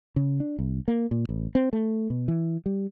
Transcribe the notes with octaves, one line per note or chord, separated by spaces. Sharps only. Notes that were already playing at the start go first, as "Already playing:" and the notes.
C#3
D4
C2
A#3
A#2
A1
C4
A3
B2
E3
G3